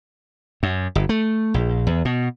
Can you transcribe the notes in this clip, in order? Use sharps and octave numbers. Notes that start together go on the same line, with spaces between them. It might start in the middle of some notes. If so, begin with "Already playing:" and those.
F#2
G1
A3
A#1
E2
B2